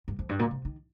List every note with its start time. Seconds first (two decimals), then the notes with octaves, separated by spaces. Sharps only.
0.08 G2
0.19 F2
0.29 G2
0.39 A#2
0.51 C3
0.65 D#3